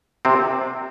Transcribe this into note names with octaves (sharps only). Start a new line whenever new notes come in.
C3 C4